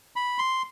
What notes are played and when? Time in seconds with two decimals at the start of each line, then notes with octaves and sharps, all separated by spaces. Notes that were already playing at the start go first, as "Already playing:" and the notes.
0.16 B5
0.38 C6